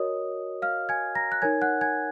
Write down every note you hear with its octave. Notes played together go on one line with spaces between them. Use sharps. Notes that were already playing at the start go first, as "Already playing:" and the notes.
Already playing: F#4 A#4 C#5 D#5 D#6
F5 F6
G#5 G#6
A#5 A#6
F#6
D#4 A#4 C#5 G#5 G#6
F#5 F#6
G#5 G#6